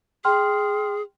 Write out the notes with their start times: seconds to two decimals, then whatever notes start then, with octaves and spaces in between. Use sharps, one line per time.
0.25 G#4 G5 C6 F6